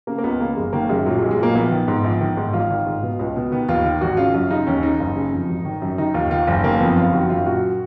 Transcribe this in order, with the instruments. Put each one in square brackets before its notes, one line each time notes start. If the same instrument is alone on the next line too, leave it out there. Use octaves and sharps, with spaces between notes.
[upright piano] C#3 A#3
A#3
C#2 B3
C#3 A#3
F#1 G#3
D#3 A#3
F#2 G#3
A#2 F#3
G#3
B1
G#3
A#2 A#3
A#1 B3
D#3
G#2
A#1
D#3
G#2
G#1 F4
D#3
G#2
B2
C#2
B2
D#3 B3
D#2 F4
D#3
G#1 F#4
C#3 F4
F#2 F4
C#3 D#4
D#2 C#4
C#3 D#4
F#1
C#3
F2
G#1
D#3
F#2
D#3 D#4
D#2 F4
D#3 F4
F#1
D#3 A#3
F2 B3
F#1 F4
D#3 F#4
F#2 F4
A#2 F#4